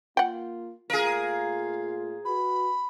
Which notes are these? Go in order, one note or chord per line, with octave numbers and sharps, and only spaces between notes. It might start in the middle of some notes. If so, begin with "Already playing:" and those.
A#3 F4 F#5 G5
A#2 A3 F4 G#4 A#4 F5
F#4 B4 B5